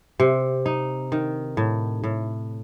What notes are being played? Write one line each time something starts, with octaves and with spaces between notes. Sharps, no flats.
C3
D#4
D#3
A2
A2